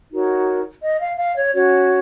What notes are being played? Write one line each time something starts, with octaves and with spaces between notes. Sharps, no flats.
D#4 F#4 A#4 C#5
D#5
F5
F5
C#5
C#4 F#4 C#5